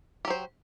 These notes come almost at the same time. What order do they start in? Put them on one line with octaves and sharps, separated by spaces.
G4 F#3 C5